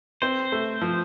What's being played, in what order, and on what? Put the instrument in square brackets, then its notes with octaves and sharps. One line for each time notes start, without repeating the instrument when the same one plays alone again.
[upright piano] C4 [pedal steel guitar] C5
[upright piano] A3
F3